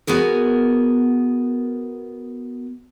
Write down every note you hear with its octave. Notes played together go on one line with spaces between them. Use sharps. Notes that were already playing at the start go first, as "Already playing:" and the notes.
B3 F#4 G#4 A#4